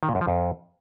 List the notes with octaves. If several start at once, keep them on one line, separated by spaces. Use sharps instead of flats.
D#3
A#2
F#2
F3
F2